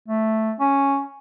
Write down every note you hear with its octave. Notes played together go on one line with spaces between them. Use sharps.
A3
C#4